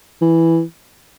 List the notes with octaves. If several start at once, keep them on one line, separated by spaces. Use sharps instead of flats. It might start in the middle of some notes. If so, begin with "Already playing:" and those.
E3